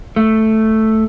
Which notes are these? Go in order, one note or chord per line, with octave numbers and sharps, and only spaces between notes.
A3